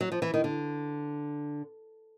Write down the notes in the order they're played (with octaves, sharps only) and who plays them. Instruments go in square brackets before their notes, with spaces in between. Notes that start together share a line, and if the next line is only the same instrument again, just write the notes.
[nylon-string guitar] F#3
F3
E3
D#3
D3